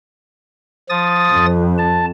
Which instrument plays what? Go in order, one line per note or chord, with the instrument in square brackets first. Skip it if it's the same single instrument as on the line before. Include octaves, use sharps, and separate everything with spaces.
[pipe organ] F3 D#6 A6
[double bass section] F2
[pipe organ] A5